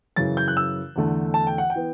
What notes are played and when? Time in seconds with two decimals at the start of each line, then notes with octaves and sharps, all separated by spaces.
0.16 F#2 C#3 E3 A6
0.37 G6
0.48 F#6
0.57 E6
0.96 E2 D3 A3
1.34 A5
1.47 G5
1.58 F#5
1.70 G5
1.76 E3 B3